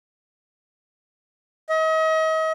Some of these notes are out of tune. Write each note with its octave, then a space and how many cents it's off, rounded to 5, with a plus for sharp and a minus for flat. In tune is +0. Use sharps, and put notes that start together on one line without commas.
D#5 +40